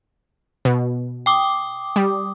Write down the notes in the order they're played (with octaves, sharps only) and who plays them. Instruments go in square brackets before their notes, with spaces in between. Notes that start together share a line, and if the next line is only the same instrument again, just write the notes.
[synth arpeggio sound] B2
[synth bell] G5 D6 D#6
[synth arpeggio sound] G3